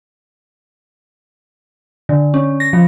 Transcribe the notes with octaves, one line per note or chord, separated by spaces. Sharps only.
D3
C#4
A#6
F3